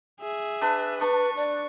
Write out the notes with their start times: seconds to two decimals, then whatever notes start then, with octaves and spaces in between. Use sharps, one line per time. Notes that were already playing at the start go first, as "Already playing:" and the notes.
0.21 G#4 E5
0.61 D4 B4
1.01 D4 B4 C#6
1.37 D5